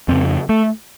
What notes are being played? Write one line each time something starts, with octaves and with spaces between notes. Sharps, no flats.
F2 C#3 C4
A3